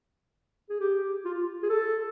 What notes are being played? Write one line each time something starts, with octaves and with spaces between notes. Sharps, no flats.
G#4
G4
F4
G#4
A4